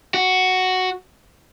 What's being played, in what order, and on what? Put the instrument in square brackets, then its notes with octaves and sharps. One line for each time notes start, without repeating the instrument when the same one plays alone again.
[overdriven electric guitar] F#4